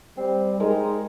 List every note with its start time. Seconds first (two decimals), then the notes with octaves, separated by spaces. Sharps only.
0.17 G3 C4
0.60 G#3 D#4 A#4